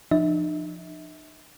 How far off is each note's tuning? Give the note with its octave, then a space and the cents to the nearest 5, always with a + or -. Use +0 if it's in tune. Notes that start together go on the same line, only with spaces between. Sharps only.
F3 -10 D#4 -45 E5 -35